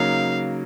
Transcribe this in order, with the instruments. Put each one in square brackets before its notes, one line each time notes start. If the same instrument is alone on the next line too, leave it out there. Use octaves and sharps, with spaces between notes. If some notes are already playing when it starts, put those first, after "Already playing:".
Already playing: [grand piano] C#3 F#3 A#3 D#4 [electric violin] F5